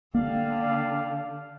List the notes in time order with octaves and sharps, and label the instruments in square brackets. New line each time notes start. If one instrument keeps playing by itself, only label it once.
[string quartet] D3 [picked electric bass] A#3 [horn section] G4 D5 F5